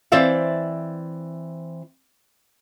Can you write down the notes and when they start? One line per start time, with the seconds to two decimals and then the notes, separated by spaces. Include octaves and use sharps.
0.12 E3 C4 C5 D5 E5 F5